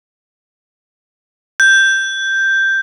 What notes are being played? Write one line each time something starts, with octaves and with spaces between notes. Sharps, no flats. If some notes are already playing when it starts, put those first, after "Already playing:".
G6